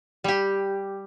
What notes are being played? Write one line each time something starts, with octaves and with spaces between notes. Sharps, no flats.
G3 G4